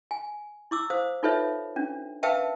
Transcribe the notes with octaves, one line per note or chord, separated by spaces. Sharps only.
G#5
E4 D6 E6
C5 F5 D#6
D#4 F4 A4 B4 C#5 E5
C#4 D4
A#4 B4 E5 F5 G5 A5